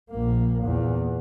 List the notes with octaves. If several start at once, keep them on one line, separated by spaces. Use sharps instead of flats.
A#1 A#3
E2 A#2